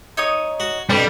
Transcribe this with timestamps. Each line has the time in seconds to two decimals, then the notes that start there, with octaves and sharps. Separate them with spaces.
0.17 D#4 C#5 D#6
0.60 F#4
0.90 F2 B2 G3 D4